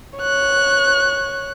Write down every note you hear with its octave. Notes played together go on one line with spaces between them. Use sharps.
C#5 F#6